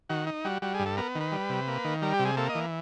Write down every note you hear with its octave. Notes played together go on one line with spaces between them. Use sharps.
D#3 F#4
D#4
G3 F#4
G3 F#4
G#4
G2
A4
B3 A#4
D#3
B4
G3
C3
A#3
D#3
G3 A#4
G4
C3
G#4
A#3 A4
D#5
E3